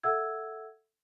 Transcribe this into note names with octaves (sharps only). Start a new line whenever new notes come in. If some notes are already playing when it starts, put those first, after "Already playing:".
A4 E5 F#5 E6 G#6